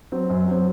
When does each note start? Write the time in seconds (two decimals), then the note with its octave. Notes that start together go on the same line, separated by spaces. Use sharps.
0.12 F#3 C4
0.30 F#2
0.48 F#3 C4